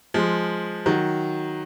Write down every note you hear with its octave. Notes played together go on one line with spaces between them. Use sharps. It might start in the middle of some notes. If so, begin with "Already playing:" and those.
F3 G#3
D#3 F#3